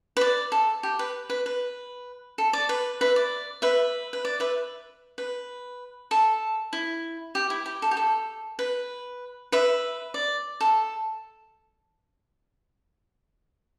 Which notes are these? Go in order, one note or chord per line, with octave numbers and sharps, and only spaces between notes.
B4
D5
A4
G4
B4
B4
B4
A4
D5
B4
B4 E5
D5
B4 E5
B4
D5
B4 E5
B4
A4
E4
G4
E4
G4
A4
G4
A4
B4
B4 E5
D5
A4